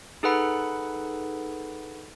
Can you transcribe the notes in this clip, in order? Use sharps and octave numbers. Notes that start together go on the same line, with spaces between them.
D#4 G#4 A4 B4 F#5 B5